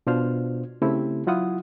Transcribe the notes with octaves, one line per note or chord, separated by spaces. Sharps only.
B2 D4 F4 C5 F6
C#3 A3 C4 E4 G4
F#3 E4 F4 F#5 D#6